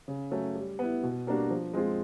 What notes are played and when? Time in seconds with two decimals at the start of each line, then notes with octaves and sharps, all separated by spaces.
0.08 C#3
0.31 F#3 A3 C#4
0.55 G3
0.79 B3 E4
1.03 B2
1.27 G3 A#3 D4 F#4
1.50 F3
1.74 G#3 C4 F4 G#4